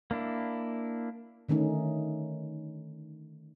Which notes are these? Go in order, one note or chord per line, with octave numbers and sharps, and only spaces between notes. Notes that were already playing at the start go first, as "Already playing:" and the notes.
A#3 D4 E4
D3 D#3 A3 C#4 D#4